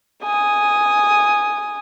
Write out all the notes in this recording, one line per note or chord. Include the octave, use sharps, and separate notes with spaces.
G#5 D#6